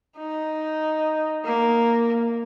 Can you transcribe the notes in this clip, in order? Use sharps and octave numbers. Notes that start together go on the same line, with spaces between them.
D#4
A#3